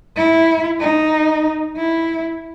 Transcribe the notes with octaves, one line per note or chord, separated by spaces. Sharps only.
E4
D#4
E4